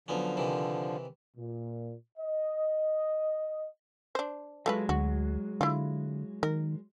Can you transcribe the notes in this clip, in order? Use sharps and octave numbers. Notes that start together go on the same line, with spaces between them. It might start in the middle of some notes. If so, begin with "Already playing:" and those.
D3 F3 F#3 B3 C#4
C3 D#3 E3
A#2
D#5
D4 C5
F#3 G#3 A3 F4 B4
D2 F#4
D3 E4 F4
D#3 A#4